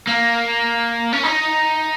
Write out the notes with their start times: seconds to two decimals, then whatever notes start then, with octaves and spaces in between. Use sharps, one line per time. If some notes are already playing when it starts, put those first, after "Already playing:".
0.07 A#3
1.13 C#4
1.24 D#4